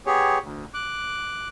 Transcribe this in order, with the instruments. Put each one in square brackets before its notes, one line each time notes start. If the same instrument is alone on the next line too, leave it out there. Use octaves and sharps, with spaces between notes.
[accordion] B3 G4 G#4 C#5
D2
D6 F#6